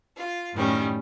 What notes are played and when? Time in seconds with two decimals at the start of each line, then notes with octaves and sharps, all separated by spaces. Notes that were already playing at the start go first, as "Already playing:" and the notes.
0.16 F4
0.53 F#2 A2 D#3 G3 C#4